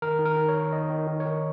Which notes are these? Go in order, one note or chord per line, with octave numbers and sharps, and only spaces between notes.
D#3 A#4
D#3
A#4
D#3
C#5
D#3
D#3 D#5
D#3
D#3
C#5
D#3